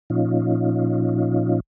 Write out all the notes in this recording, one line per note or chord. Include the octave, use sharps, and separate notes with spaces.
A#2 F3 C#4 D#4 F4